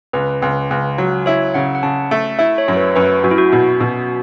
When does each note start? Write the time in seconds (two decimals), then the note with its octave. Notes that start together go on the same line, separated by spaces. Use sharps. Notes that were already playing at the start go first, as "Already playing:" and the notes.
0.13 C#2 B4
0.42 C#2
0.71 C#2
0.98 F#3
1.26 E4 C#5
1.54 C#3 F#5
1.75 F#5
1.83 C#3 A5
2.11 A3
2.39 E4 E5
2.58 C#5
2.68 F#2
2.73 C#5
2.76 B4
2.95 F#2 B4
3.24 F#2 F#4
3.31 E4
3.38 F#4
3.52 B2
3.80 B2